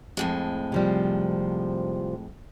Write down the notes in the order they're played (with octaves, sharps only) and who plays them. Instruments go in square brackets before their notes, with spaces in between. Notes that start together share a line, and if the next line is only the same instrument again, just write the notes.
[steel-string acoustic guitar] F2 A2 G#3
[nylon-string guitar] C3 F3 G3